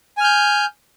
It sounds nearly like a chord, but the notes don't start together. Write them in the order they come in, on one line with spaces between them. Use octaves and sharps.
G#5 F6 G6